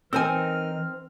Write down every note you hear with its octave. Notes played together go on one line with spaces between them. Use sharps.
E3 C4 D#4 A#4 C5 G#5 E6 F6